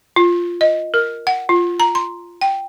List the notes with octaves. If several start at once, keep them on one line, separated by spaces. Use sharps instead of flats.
F4
D#5
A#4
F#5
F4
A#5
C6
G5